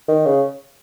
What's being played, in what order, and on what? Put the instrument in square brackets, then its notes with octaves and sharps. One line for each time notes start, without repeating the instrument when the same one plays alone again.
[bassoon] D#3
C#3